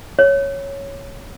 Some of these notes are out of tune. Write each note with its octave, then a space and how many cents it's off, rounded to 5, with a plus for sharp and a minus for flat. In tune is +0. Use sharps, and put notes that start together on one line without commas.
C#5 +0